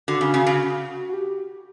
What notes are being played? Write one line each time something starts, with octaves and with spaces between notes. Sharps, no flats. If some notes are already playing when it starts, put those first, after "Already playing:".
D3 F#4
C#3
C#3
C#3
F#4
G4